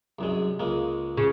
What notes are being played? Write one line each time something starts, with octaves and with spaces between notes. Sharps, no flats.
C2 F#2 G#3
C#2 G#3 A#3
C#3